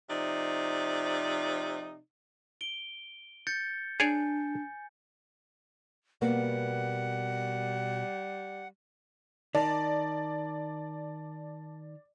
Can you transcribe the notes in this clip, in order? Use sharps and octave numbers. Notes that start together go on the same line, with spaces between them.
C3 F3 D#4 D5
D7 G7
G6 A6 C#7
D4 G#4 C#5 D5 G#5
B2 G3 A#3 B3 F#5
D#3 D5 A5